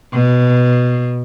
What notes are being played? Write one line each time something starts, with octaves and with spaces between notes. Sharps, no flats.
B2